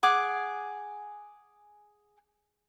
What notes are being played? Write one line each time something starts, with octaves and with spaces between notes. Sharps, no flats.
G#4 F#5 G#5 D6